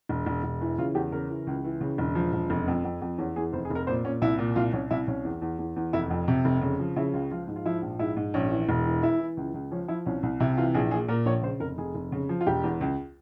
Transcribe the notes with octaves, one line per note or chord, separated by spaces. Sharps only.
E1
E1
E1
E3
C#3 F4
E2 G4
C#3 A#4
E3
C#2
E3
C#3
E1
F3
E1
F1
F2
F2
F2
E2 C#4
E2 G#4
F1 C5
G#4
F1 A#4
A#2 C5
A#2 C#4
C2 E4
A#2
C2 F4
C2 C#4
C2 E4
C2 C#4
E2
E2
E2
E2
F1 E4
F2
C3
F1
C#3
F3
C#3 E4
C#2 F4
F3 F4
G#2
F4
F3 E4
A#1
G#2 E4
G#2
A#1 C#4
E3
E1
E3
E3 E4
E3
C#2
C#2
F3 C#4
F3 E4
C2 C#4
C2
C3 E4
E3 F4
A#1 G#4
A#2 G#4
A#2 A#4
A#1 C#5
C#3 C5
F1 A#4
F1 G#4
F1
C#3
F3
F4
E1 G4
E2
C#2